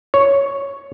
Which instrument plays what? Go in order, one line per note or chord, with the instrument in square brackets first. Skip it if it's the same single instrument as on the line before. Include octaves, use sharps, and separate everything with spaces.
[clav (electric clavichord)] C#5